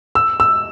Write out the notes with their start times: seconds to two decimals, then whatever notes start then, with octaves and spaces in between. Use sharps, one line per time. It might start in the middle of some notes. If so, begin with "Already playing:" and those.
0.15 E6
0.40 E6